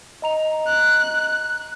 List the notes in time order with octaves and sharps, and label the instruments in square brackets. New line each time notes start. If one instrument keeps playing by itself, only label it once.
[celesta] D#5 A#5 F7
[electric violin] F#6